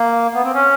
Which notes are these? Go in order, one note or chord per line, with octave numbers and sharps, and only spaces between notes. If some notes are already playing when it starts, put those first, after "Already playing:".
Already playing: A#3
B3
C4
C#4